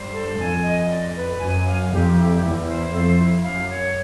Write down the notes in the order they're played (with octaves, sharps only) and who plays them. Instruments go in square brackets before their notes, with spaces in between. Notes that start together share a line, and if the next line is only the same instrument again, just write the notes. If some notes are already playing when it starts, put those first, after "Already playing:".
Already playing: [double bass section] G2 [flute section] C5
[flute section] A4
[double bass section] F2 [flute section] G#5
[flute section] D#5
D5
B4
[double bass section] F#2 [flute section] G#5
[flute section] F5
[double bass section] F2 [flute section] G4
[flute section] E4
[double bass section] E2 [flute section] E4
[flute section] C5
[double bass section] F2 [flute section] A4
[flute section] E4
[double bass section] F#2 [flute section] F5
[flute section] C#5